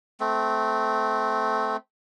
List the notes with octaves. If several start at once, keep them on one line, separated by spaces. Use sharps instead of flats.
A3 C4